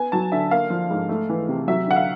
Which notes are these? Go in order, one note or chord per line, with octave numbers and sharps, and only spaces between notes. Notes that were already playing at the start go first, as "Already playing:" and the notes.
Already playing: B3 G#5
F#3 A5
D3 E5
A#3 F5
F3
G#2
A3
E3
C3
F#3 E5
D3 F#5
F5